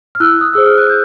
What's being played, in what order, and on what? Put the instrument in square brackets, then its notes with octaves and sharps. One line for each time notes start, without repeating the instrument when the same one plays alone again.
[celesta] F6
E4 E6 F#6
D#6
G#4 C5 E6
F6
F#6
G6